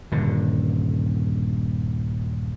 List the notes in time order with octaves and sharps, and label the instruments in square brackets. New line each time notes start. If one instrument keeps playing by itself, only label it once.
[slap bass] D#1 G2 D3